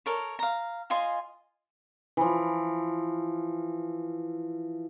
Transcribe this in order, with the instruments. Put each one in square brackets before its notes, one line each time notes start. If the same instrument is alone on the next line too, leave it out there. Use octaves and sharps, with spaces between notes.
[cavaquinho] A4 A#4 C#5
F5 A#5
F4 D#5 G#5 C6
[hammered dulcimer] E3 F3